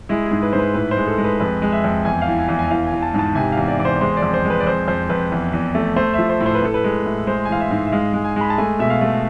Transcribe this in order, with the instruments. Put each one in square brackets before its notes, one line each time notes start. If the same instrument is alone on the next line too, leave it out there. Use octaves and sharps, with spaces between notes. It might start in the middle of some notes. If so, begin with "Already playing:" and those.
[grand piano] G#3 E4
G#4
G#2
B4
G#2 C5
B4
A2 B4
C5
G#3
A4
G#3
B4
F2 B4
G#3
E5
F2
E2 G#5
F5
E3
G#5
E2
G#5
E3 F5
G#5
E3
A5
G#2
A5
C3 G#5
F5
E2
D5
E2 D5
C5
G#3 C5
D5
F2
C5
G#3
B4
D5
F2 C5
F2 C5
F2 B4
E2
E2
A3
A3 C5
F3 E5
C5
A2
C5
B4
A2 A4
B4
G#3
A2
G#3 C5
G#5
E3 F5
E5
G#2
E5
G#3 F5
G#3
G#5
G#3 B5
A5
A3 G#5
B2 E5
F5
A3